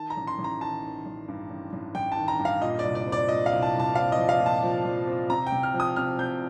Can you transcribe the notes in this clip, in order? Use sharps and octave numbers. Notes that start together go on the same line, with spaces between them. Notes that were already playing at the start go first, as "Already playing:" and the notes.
Already playing: D#3 A5
A#5
A1
C6
A1
A#5
D#3 A5
D#3
A1
G2
A1
A1
A1 G5
A5
D#3
A#5
G2
F5
A#2 D#5
D5
C2
D5
C4
D5
A#2 D#5
F5
C2
A5
C2
A5
C4 F5
D#5
F3
F5
A#2
A5
F3
F3
C4
C3 A#5
G5
C3
F6
F3
D#6
C3 F6
C3 G6